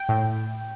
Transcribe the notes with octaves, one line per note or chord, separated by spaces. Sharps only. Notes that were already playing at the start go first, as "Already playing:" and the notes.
Already playing: G5
A2